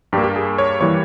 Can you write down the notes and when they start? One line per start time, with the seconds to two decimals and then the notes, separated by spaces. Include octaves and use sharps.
0.13 G2 G3 A#3 G4
0.24 G4
0.36 G#4
0.58 C#5
0.81 E3 G3 A#3 C#5